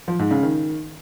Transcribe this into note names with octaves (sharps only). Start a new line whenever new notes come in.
F3
G#2
C#3
D#3